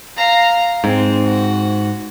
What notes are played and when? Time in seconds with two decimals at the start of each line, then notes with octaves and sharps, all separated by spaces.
0.17 F5 A#5
0.84 G#2 C4
1.25 F#4